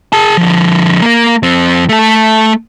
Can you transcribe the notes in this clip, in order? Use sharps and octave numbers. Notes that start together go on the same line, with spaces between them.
G#4 A5
D3 F3
A#3 A#4
F2 C4
A3 A4